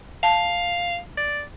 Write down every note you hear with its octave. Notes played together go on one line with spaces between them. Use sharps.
F5 A5
D5